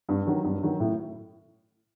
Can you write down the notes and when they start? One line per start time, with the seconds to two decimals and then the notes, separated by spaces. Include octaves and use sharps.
0.09 G2
0.26 D#3 F#3
0.44 G2
0.62 D#3 F#3
0.80 A2